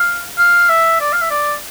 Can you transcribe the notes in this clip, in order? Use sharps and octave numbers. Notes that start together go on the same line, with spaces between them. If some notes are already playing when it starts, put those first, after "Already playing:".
Already playing: F5
F5
E5
D5
F5
E5
D5